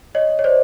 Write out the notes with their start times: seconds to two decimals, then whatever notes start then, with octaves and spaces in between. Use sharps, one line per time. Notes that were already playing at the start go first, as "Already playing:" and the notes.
0.15 C#5 D#5
0.39 C#5
0.44 C5 D5